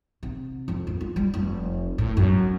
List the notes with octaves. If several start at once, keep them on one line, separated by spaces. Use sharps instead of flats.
C3
F2
F2
F4
G3
F1
A2
F#2